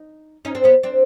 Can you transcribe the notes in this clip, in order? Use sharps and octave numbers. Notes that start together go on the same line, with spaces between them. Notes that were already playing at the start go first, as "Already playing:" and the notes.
Already playing: D#4
C#4 D#4
C4 D4
B3 C#4
C4 D4